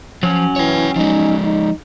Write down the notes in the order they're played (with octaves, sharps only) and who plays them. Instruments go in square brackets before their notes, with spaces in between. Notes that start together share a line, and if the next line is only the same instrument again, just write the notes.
[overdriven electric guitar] F3 [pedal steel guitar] F#3 C#4
[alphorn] E3 [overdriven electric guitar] C#5 G5
[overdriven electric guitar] F3 G#3 [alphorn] D#4
[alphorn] D#4